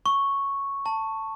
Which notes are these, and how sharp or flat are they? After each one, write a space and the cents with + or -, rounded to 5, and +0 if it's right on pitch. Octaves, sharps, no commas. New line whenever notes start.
C#6 +0
A5 +15